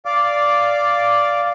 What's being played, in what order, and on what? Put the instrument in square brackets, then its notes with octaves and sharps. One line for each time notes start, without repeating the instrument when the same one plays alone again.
[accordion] D5 F5 D6